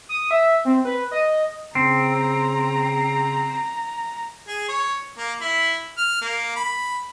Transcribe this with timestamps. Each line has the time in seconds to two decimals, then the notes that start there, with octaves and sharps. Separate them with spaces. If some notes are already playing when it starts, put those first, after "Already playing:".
0.09 D#6
0.31 E5
0.65 C4
0.85 B4
1.11 D#5
1.75 C#3 C4 A#5
4.47 G#4
4.68 C#5
5.18 A#3
5.41 E4
5.98 F6
6.22 A#3
6.56 B5